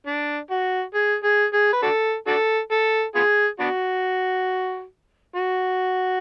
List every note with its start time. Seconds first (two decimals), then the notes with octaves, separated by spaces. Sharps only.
0.07 D4
0.51 F#4
0.94 G#4
1.24 G#4
1.54 G#4
1.73 B4
1.83 D4 F#4 A4
2.27 D4 F#4 A4
2.72 A4
3.15 B3 F4 G#4
3.60 B3 D4 F#4
5.36 F#4